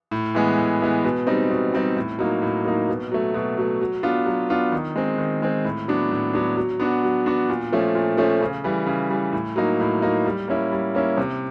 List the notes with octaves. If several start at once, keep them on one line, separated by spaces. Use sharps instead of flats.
A2
E3 G#3 B3
A2
E3 G#3 B3
B2
G3 C4 D#4
B2
G3 C4 D#4
A2
F#3 A#3 D#4
A2
F#3 A#3 D#4
B2
F#3 A3
B2
F#3 A3
F#3
B3 D4 F4
F#3
B3 D4 F4
D#3
G#3 C4
D#3
G#3 C4
A2
F#3 B3 D4
A2
F#3 B3 D4
F#3
B3 D4 F#4
F#3
B3 D4 F#4
A#2
F3 A3 C#4
A#2
F3 A3 C#4
C#3
E3 G3
C#3
E3 G3
A2
F#3 A#3 D#4
A2
F#3 A#3 D#4
G3
A#3 C#4 E4
G3
A#3 C#4 E4
C3